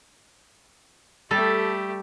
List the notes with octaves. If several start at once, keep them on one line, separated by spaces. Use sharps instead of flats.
G3 A3 G4 A4